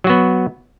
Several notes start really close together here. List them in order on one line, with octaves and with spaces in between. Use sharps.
F#3 F#4 B3